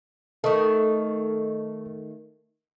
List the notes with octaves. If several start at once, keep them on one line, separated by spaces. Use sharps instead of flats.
D#3 A3 A4 D#5 C#6